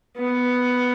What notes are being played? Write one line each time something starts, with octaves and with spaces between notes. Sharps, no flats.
B3